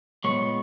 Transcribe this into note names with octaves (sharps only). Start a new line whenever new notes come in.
A#2 G#3 B3 C#5